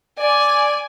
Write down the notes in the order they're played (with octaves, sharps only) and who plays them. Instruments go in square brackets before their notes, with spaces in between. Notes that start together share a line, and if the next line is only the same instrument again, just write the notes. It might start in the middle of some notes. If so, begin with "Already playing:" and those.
[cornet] D5 [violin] G#5